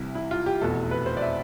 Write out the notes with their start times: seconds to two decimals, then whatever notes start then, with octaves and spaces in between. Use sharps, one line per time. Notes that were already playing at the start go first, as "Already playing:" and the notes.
Already playing: C2 C3 E3 E4
0.15 E4
0.31 F4
0.46 G4
0.61 F1 E2 B2 A4
0.91 B4
1.06 C5
1.17 D5
1.22 E5